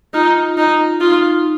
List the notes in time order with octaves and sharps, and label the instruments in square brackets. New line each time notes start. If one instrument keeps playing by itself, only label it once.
[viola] D#4 [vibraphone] F4
[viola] D#4
[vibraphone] D#4 [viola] F4